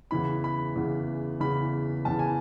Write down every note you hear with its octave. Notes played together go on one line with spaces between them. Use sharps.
E2 C#3 E3 B5
B5
E2 C#3 E3
E2 C#3 E3 B5
E2 C#3 E3 A5
G#5